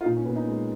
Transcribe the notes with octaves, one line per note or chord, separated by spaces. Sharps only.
F4
A#2 D#4
C#4
A#2 B3
D#4
G#3